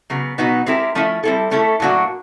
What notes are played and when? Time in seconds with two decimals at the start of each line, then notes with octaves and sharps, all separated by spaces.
0.10 C#3 F#3 B3
0.38 B2 F#3 B3 D#4 F#4
0.66 G#3 C4 E4 G4 A#4
0.95 F3 A3 C#4 E4
1.23 G3 C4 E4 A4
1.51 A3 C#4 E4 A4
1.80 A2 F#3 A#3 D4 F#4